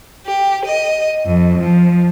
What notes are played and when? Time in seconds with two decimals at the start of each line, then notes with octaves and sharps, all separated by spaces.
0.25 G4
0.65 D#5
1.25 F2
1.58 F3